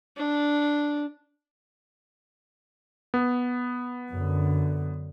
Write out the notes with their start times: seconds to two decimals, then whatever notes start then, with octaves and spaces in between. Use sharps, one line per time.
0.16 D4
3.14 B3
4.11 F#2 D3